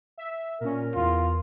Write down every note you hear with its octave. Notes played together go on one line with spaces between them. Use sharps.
E5
A#2 C#4 A#4
E2 F4